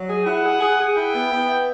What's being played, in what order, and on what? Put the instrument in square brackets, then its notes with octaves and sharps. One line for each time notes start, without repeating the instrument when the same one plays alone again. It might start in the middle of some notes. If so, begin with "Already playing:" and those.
Already playing: [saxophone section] F#3
G#4
[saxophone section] E4 [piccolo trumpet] F#5
[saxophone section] G#4
G#4
G#4
[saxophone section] E4 [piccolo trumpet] G5
[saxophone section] B3
B3
E4